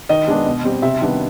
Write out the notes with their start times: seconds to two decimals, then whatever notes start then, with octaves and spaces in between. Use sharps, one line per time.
0.09 D#3 D#5
0.28 G#3 B3 D4
0.46 B2
0.64 G3 C4
0.82 C3 E5
1.01 D#3 G3 B3 D4